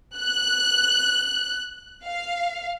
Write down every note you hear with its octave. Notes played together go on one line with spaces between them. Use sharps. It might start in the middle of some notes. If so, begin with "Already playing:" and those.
F#6
F5